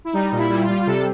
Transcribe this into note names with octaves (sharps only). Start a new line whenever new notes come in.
E4
G3 D#4
A#2
E4
G3
F4
G3
C3 A4